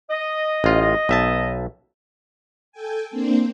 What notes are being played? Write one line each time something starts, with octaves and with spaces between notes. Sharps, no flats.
D#5
A1 F4
D#5
B1 E5 A5
A4 G5 G#5
A#3 C4 D4 C5